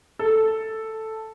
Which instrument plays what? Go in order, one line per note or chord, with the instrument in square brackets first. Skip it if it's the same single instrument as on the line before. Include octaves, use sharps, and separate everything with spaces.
[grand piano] A4